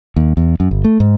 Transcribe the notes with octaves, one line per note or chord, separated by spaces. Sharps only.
D#2
E2
F#2
G1
A3
G#2